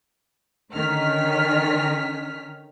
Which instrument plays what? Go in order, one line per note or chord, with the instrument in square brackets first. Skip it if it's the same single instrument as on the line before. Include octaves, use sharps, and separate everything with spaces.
[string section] D3 D#3 C#4 F6 B6